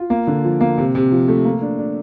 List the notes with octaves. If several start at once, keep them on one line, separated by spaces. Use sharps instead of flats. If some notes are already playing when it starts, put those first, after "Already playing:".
Already playing: F4
A#3
D3
F3
A#3
C3
C3
F3
A3
A#3
D4
D4